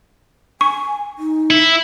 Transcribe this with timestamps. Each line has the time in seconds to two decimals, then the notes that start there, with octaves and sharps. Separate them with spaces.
0.61 G#5 C#6
1.18 D#4
1.51 E4